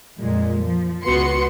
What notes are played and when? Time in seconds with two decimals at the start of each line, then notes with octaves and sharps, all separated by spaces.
0.19 F2 A#2 G#3
0.63 F3
1.03 C#2 B3 F#4 B4 C6 C#7